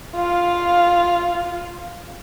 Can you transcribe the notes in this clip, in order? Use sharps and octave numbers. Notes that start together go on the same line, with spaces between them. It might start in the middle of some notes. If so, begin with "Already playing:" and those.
F4 F5